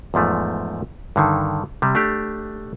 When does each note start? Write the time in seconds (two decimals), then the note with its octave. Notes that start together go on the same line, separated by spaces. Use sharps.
0.14 E2 G#2 F3 A3
1.16 G2 D3 D#3
1.82 C3 G3
1.95 A3 D4 G4